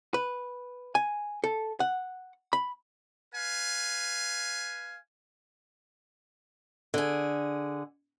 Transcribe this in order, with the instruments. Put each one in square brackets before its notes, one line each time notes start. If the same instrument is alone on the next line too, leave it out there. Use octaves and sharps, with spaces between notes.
[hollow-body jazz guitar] B4
G#5
A4
F#5
B5
[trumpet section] B4 F5 G#5
[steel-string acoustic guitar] D3 G#4